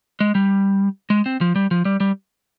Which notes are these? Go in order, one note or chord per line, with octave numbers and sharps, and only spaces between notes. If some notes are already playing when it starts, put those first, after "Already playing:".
G#3
G3
G#3
C4
F3
G3
F3
G3
G3